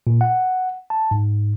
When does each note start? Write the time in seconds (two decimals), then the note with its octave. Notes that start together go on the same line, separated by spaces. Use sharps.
0.07 A#2
0.21 F#5
0.90 A5
1.11 G#2